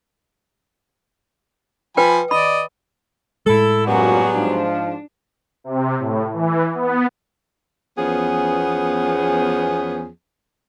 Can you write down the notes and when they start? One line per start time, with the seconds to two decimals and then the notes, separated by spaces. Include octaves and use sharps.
1.97 F3 B4 G5 G#5 B5
2.31 D5 D#5 B5
3.46 A2 G#3 E4 A4
3.87 F#2 A#2 F#3 G3 B3 F#4 G#4
4.35 G#2 F3 D4
5.64 C3
5.99 A2
6.33 E3
6.75 B3
7.97 E2 F3 B3 C#4 G#4